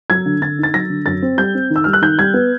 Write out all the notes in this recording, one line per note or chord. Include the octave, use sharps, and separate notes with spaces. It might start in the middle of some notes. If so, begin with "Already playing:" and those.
F#3 G#6
D3
D3 A6
D#4 A6
F#3 A#6
D3
F#2 A6
C4
G3 G6
C4
D#3
E6
G3 F6
F#6
D#3 G6
G3 G#6
B3